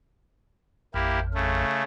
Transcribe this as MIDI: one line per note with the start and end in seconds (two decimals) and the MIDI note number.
0.94 1.65 33
0.94 1.65 41
0.94 1.19 58
0.94 1.19 64
0.94 1.19 67
1.34 1.83 49
1.34 1.83 57